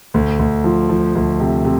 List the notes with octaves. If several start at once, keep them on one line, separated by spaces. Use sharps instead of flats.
D2
D2
F3
F3
D2
C3
C3